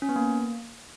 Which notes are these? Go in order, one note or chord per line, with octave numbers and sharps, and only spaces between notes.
C#4
B3
A#3